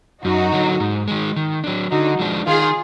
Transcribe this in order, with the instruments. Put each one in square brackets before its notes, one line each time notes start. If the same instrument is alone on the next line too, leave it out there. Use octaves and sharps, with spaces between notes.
[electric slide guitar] F#2 [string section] D#4 F#4
[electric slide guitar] D3 F#3
G#2
D#3 G#3
D#3
F#3 D4
[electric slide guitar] D3 [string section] D#4 F#4
[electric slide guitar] F3 G#3 D4
[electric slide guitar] D#3 [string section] F4 G#4